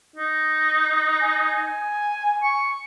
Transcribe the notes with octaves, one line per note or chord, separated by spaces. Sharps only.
D#4
G#5
C#6